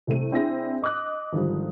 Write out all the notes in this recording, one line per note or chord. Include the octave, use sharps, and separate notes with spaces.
C2 C3 A3 D#7
C4 D4 E4 G#4 A#6
D#5 D6 D#6 F#6
G#1 D3 F3 G3